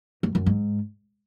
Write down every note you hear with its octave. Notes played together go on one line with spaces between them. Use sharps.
F#2
F#2
G#2